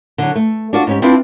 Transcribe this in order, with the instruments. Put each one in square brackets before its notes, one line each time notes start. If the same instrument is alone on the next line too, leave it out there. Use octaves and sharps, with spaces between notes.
[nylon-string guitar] D3 F#3
A3
D4 F4 F#4 A4 D5
G#2 C#4 G4
C4 D4 E4 F4 B4